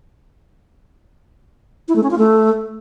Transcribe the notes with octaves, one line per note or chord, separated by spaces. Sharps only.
E4
A3
C#4
F4
A3